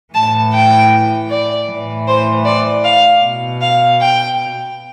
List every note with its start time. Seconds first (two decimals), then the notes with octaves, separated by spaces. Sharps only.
0.14 A2 E3 A5
0.53 G5
1.30 D5
1.69 A2 E3
2.07 C5
2.45 D5
2.84 F5
3.23 B2
3.62 F5
4.00 G5